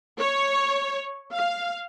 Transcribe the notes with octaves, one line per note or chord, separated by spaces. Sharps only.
C#5
F5